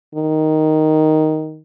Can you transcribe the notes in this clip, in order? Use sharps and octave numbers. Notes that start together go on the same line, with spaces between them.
D#3